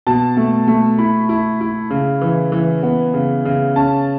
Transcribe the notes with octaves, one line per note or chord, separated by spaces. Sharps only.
B2 A5
A3
A3
E4 B5
E4
E4
C#3
E3
E3
B3
C#3
C#3
C#4 A5